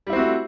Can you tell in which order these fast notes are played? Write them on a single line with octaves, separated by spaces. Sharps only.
G3 E4 C4 F#4 A3